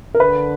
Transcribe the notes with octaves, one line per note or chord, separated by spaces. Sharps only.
A#4
D3 B4